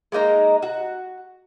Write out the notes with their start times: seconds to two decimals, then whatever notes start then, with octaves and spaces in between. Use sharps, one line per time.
0.12 G#3 A#3 D#4 A#5
0.63 F#4